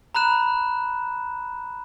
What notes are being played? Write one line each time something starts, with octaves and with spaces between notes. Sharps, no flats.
A#5 B5 F#6 E7